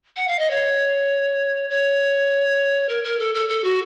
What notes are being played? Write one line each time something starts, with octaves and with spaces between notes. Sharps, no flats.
F#5
F5
D#5
C#5
C#5
A#4
A#4
A4
A4
A4
F#4